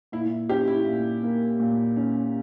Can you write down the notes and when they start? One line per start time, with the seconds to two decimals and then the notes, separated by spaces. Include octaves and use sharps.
0.12 A#2 E4
0.49 C#4 G4
0.67 E4
0.87 A#2
1.23 A#3
1.60 A#2
1.96 C#4